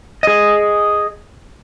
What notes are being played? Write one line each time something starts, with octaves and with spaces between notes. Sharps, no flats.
G#4 D#5